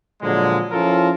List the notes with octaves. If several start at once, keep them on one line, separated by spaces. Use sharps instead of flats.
A#2 D3 F3 F#3 G#3
F3 C#4 E4 F4 A4 A#4